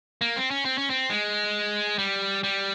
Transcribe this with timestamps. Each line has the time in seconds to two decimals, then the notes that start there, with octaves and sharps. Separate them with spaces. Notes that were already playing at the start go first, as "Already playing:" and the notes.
0.21 A#3
0.36 C4
0.51 C#4
0.65 C4
0.78 C#4
0.90 C4
1.10 G#3
1.99 G3
2.43 G3